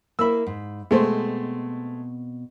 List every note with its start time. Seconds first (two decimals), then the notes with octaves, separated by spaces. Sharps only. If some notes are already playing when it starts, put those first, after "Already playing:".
0.19 A#3 E4 E5 B5 E6
0.47 G#2
0.91 B2 G#3 A3 C4 C5